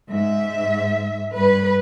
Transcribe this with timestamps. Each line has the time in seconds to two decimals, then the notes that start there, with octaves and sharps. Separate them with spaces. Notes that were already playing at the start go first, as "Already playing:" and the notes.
0.12 G#2 E5
1.35 G2 B4